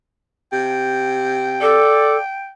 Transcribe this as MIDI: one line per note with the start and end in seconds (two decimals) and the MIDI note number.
0.52 1.80 48
0.52 2.52 79
1.62 2.17 69
1.62 2.18 74